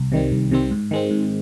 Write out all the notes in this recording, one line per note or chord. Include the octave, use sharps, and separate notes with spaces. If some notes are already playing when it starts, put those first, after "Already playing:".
Already playing: C2
C3 D#3 G3 C4
C2
C3 D#3 G3 C4
G#2
D#3 G#3 C4
G#2